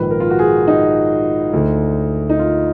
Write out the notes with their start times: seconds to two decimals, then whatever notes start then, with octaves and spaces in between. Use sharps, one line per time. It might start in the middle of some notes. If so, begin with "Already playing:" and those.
Already playing: A#1 G#2 D#3 B4
0.11 A#4
0.20 F4
0.30 F#4
0.39 G#4
0.68 D#4
1.53 D2 D3
2.30 D#4
2.39 F4